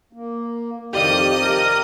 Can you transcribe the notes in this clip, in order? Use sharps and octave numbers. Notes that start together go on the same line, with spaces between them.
A#3
F2 C3 D#3 G4 D5 D#5 F5 D#6
A#4 A5